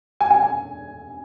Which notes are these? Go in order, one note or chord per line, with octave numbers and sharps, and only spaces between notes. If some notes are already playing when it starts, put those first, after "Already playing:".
G#5
G#5
G#5